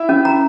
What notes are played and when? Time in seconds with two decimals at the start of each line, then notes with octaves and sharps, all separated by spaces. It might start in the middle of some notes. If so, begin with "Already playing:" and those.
Already playing: E4 E5
0.09 C#4
0.25 A#5